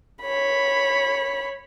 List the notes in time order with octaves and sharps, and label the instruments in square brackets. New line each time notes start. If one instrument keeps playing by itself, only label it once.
[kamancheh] C#5 B5